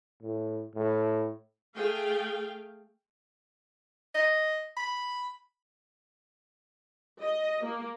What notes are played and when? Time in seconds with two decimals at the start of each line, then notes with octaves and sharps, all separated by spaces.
0.22 A2
0.75 A2
1.75 A3 G#4 F5 G5
4.15 D#5
4.77 B5
7.20 D#5
7.65 A#3